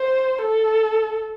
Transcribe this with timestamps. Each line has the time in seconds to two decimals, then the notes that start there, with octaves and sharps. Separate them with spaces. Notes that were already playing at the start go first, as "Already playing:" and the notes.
Already playing: C5
0.42 A4